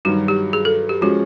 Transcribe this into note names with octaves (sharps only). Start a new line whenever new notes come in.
G2 D#3 F#3 F#4
G4
G#4
A4
G4
F3 G#3 C#4 F#4